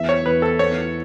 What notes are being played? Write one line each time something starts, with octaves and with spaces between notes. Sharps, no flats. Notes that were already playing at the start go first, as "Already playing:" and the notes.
Already playing: E2 E5
C#5
E2 B4
A4
B3 C#5